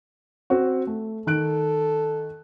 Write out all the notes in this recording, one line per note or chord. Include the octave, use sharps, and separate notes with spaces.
C4 F#4
A3
D#3 A4 F#6 D7